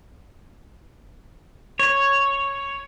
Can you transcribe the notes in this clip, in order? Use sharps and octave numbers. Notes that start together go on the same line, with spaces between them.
C#5